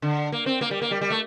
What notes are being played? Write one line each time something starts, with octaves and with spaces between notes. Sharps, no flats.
D3
A#3
C4
A#3
G3
A#3
G3
G3
A3